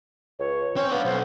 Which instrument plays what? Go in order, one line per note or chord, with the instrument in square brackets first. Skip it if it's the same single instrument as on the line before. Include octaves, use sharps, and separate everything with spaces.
[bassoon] C#2 [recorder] C#5
[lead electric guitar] C4 [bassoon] C#4
[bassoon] B3 [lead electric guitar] D4 F5
[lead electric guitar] B1 [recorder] C5